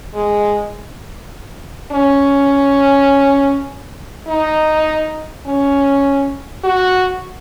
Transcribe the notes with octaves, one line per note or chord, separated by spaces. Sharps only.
G#3
C#4
D#4
C#4
F#4